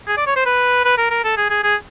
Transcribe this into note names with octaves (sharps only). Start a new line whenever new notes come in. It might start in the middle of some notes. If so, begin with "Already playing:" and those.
G#4
D5
C#5
C5
B4
B4
A#4
A#4
A4
G#4
G#4
G#4